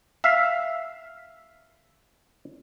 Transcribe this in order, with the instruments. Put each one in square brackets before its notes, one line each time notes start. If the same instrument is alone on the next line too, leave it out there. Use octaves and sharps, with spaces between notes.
[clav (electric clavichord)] E5 F5